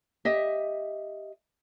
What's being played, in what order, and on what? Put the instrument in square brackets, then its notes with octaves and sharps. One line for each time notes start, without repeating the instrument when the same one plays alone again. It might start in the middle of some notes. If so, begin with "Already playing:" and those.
[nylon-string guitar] G4 D#5 E5